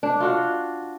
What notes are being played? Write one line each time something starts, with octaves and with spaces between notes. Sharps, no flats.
D4
F4 F#4 F#5